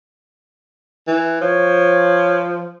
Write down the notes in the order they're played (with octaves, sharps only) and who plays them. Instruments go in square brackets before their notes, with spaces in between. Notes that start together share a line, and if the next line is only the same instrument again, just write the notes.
[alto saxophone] E3
[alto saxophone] F3 [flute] C#5